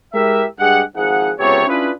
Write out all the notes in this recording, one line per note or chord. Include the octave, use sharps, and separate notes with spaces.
G#3 E4 G4 A#4 E5
G2 G#3 G4 G#4 F#5
G#1 F3 D#4 G#4 F#5
C#2 C3 B3 G4 A4 C#5
C#4 D4 E4 F4 G#4 B4